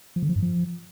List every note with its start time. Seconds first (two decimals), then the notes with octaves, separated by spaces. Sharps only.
0.16 F3
0.23 D3
0.29 F3
0.36 G2
0.42 F3